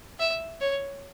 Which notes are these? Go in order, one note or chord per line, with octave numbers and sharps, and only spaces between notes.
E5
C#5